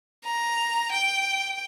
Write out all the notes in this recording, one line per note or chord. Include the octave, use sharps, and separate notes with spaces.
A#5
G5